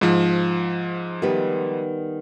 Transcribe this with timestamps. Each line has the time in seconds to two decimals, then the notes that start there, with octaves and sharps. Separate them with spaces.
0.01 G#2 F3
1.22 D#3 G3 B3